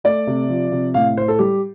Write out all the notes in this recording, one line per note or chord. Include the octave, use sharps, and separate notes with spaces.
A3 D5
C3
F3
C3
A2 F5
A2 C5
A4
G3 G4